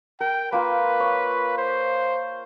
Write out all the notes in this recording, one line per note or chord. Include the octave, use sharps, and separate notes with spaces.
A#4 G5
A#3 F4 B4
C#5
C5